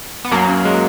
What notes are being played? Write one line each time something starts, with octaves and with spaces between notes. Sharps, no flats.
B3
F#2 F#3 A#3
C#4
G#3